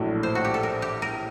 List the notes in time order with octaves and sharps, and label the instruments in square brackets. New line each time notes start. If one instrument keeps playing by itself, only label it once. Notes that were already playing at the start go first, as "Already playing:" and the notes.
Already playing: [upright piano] A#1 A2 F#3 A3 D4
[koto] C5
F#4
G4
A4
A#4
G4
A#4